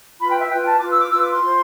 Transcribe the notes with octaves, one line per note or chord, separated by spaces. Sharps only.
F4 B4 B5
G5
E5
F4 B4 G5
A5
F4 B4 D6
E6
D6
F4 B4 E6
D6
C6
F4 C5